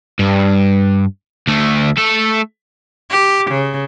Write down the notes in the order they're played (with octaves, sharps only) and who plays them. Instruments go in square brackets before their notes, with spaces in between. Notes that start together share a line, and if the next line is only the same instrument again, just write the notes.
[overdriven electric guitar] G2
D2 A3
A3 A4
[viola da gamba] G4
C#3